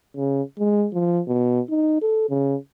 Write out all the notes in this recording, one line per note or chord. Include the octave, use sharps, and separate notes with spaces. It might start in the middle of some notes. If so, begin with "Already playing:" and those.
C#3
G#3
F3
B2
D#4
A4
C#3